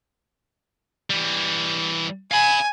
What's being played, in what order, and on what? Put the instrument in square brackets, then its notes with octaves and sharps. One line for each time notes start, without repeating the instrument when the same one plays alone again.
[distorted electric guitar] E3 G3
[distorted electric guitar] F5 B5 [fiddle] G#5